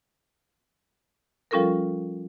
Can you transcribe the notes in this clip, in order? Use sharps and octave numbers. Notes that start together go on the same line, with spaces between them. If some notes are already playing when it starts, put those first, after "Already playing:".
F3 G3 C#4 F4 A4 A#4